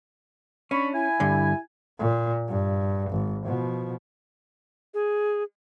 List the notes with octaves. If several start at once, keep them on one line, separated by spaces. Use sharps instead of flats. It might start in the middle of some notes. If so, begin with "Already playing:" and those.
C#4 D4 B5 C#6
E4 G#5
G2 D3
A#2
G2
G#1
B2 F3
G#4